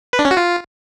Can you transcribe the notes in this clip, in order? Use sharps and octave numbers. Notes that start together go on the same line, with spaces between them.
B4
D4
C#4
F#4
F4